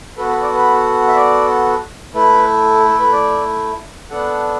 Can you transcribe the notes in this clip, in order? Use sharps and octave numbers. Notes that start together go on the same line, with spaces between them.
B3 F#4 A4 B4
B4
D5
B4
E5
D5
A3 E4 A4 B4
A4
B4
D5
B3 D4 A4 F#5